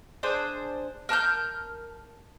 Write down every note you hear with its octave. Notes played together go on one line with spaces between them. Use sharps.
D4 G#4 C5
A#4 A5 F6 G6